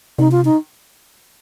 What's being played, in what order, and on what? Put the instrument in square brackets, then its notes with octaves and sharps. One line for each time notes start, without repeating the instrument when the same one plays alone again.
[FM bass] C3 [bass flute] D#4
[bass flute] F4
D#4